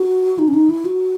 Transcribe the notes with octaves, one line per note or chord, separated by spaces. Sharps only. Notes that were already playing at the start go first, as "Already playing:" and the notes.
Already playing: F#4
D#4
C#4
D#4
E4
F#4